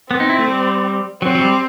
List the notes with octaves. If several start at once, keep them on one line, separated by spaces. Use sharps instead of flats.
B3 C4
D#4
E4
A3
G3
F#3 C4
F#3
G3